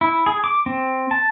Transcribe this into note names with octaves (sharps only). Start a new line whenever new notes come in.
E4
G#4
D6
C4
A5